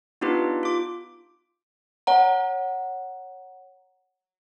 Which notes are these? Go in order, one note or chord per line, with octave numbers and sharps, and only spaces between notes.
B3 D4 D#4 F4 G4 B4
F4 D6
C#5 F#5 A#5